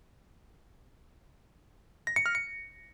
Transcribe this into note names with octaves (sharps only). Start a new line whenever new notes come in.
A#6
C#7
F6
C#7